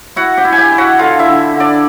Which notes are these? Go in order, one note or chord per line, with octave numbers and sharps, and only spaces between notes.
E4 F#4 F#5
G4 G5
E4
G#5
G4 G5
E4
F#4 F#5
D3 F4 F5
E4 E5
D3
D3
D4 D5